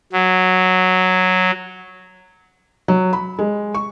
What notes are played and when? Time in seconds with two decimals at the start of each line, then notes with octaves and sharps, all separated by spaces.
0.13 F#3
2.88 F#3
3.13 B5
3.39 G#3
3.74 C#6